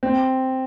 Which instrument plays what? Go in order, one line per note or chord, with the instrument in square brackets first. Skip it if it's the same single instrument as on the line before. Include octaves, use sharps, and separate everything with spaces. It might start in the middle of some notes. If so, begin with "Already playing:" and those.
[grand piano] C4